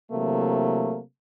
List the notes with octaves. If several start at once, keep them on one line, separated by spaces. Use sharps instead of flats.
C3 E3 F#3 A3 A#3